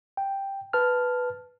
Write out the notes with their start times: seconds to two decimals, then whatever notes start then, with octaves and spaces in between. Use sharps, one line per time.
0.17 G5
0.73 B4 A5 F6